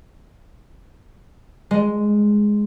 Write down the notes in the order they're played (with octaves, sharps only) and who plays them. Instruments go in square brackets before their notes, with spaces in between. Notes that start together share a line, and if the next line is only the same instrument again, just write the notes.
[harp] G#3